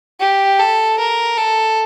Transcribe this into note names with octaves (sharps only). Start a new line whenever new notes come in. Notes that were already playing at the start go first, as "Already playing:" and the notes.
G4
A4
A#4
A4